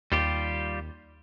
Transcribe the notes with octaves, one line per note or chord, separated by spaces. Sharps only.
D#2 G3 F4 G4